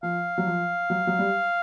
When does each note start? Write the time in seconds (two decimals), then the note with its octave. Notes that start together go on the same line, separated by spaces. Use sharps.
0.03 F3 F5
0.38 F#3
0.46 F3
0.90 F#3
1.07 F#3
1.19 G3